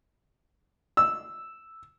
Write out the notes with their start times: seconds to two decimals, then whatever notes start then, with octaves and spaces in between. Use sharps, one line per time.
0.97 E6